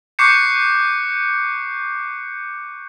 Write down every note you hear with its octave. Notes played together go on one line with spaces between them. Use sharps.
C#6 D6 F#6 G6 C7 C#7